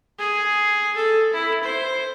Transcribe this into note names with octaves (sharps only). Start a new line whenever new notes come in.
G#4
A4
E4
C5